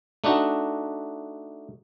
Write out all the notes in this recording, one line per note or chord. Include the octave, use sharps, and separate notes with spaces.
A3 D4 D#4 F#4